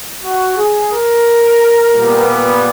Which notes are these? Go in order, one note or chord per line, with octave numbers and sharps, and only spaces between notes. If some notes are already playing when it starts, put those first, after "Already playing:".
F#4
G#4
A#4
A#2 G3 B3